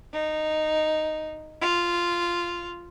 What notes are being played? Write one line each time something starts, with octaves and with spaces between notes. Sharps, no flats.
D#4
F4